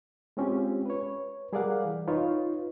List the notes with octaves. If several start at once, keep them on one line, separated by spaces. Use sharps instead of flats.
G#3 C4 C#4 F4 G4
B4 C#5
G3 G#4 A#4 D5 F5 F#5
E3
D#4 F4 B4 C#5